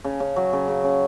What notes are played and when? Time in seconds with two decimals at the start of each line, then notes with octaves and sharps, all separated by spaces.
0.04 C#3
0.20 C#3
0.36 F#3
0.53 C#3
0.68 C#3
0.84 C#3